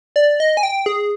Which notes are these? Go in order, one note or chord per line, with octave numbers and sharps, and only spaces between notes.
D5
D#5
G#5
G5
G#4